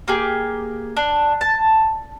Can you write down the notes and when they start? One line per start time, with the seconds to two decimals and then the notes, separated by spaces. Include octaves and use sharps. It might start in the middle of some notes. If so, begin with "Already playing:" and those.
0.08 A#3 G4 G#4
0.96 D4
1.41 A5